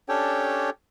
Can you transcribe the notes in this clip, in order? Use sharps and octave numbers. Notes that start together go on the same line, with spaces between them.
C#4 D4 G4 A4 C#5 G5